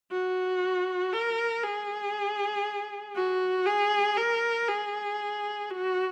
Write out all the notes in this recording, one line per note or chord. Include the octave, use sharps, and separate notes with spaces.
F#4
A#4
G#4
F#4
G#4
A#4
G#4
F#4